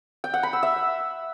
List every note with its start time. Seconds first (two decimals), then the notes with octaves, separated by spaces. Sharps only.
0.24 G5
0.34 F#5
0.43 B5
0.53 E6
0.63 E5